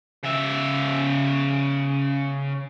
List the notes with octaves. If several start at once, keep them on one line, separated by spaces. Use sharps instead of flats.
C#3 E5